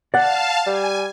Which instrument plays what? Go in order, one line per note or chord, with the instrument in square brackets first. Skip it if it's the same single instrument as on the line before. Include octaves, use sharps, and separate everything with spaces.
[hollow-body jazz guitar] D5 F#5 [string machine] F5 A5
[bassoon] G3 [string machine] G#5